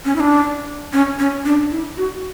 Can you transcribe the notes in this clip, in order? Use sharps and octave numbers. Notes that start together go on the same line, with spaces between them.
C#4
E4
D4
C#4
C#4
D4
E4
F#4